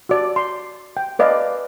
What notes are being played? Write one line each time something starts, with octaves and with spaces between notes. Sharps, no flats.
F#4 D5
C6
G5
B4 D5 D#5 F5